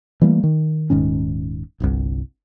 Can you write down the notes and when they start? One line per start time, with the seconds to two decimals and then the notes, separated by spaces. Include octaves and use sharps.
0.21 E3 G3 A3 A#3
0.43 D#3
0.90 D#1 G#2 D#3 C#4
1.80 D1 G1 C2